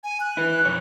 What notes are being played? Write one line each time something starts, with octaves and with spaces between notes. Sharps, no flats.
G#5
F#6
E4 B4
B1 F2 C#5